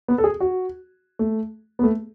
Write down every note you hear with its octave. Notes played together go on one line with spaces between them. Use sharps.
B3
A4
G#4
F#4
A3
B3
A3